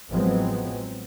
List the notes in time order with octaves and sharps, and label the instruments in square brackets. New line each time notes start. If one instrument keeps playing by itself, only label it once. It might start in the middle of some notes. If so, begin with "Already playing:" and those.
[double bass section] A1 F3 F#3 G#3 B3 C4